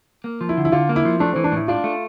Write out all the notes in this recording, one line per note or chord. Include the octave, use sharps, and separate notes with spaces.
A#3
F3
E4
D3
E4
D3 F4
A#3
E4
F3
A3 D4
E3 C4
D4
A2 E4
D4 F4
A3